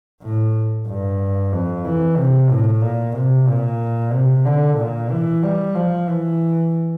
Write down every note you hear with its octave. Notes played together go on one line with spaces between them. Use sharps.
A2
G2
F2
E3
C3
A2
A#2
C3
A#2
C3
D3
A#2
E3
G3
F3
E3